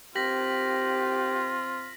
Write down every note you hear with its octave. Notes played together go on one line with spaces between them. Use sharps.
C4 F4 G4 A#6 B6 F#7